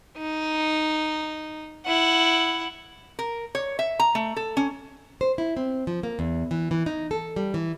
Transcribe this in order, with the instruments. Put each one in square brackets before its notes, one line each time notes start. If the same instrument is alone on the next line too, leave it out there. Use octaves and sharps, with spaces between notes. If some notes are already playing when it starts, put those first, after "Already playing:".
[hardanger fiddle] D#4
E4 F#5
[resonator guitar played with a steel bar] A#4
C#5
E5
A#5
A3
A4
C#4
[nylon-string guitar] C5
E4
C4
F3
A#3
E2
E3
E3
D#4
A4
G3
E3